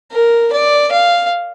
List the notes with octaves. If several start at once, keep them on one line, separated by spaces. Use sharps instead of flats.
A#4
D5
F5